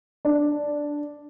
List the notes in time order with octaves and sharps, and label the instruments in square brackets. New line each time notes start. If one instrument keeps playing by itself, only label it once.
[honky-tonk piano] D4